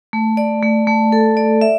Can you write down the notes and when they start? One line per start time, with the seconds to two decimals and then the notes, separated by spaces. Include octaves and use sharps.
0.13 A3
0.37 D5
0.62 A3
0.87 A3
1.12 A4
1.37 D5
1.61 E5